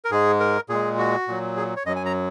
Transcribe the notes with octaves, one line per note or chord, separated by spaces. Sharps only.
A#4
G#2 G#3 G#4
A#4
A#2 G#3 G#4
F#4
A#2 F#3
G#4
C#5
F#2 F#3 D#5
G#5
A#5